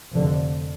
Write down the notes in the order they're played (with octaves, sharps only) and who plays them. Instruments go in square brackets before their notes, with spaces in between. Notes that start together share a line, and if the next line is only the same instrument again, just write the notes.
[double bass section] F1 F2 D3